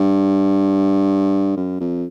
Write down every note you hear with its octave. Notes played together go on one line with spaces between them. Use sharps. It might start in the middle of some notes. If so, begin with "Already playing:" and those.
Already playing: G2
F#2
F2